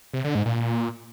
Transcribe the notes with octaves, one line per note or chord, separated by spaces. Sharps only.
C3
D3
G#2
A#2